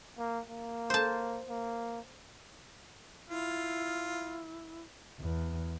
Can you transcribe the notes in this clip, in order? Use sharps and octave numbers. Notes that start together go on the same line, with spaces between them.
A#3
A#3
C5 A5
A#3
E4 F4
E2